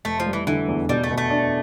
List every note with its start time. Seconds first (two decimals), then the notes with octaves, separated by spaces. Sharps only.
0.05 F1 A3
0.20 F3
0.26 G3
0.33 E3
0.47 D3 E3
0.68 E2
0.89 B2 G3
1.04 A3
1.10 B2
1.17 A3
1.30 D4